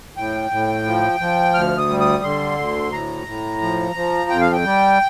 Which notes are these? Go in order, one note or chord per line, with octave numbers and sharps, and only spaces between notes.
A2 G5
A2
F3
F3
D2 F6
D#6
G3
D#6
D3 C6
D2
A2 A#5
A2
F3
F3
F2 G5
F5
G5
G3